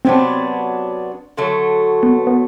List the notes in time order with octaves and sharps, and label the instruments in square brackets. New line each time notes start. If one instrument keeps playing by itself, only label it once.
[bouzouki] C3 F#3 B3 D4 [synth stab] C4
[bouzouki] D3 F#3 A3
[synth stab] B3
B3